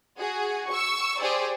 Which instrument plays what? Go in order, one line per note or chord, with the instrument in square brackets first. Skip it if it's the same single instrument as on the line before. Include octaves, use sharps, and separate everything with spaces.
[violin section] F#4 G#4
C#6 E6
G4 G#4 C5 D5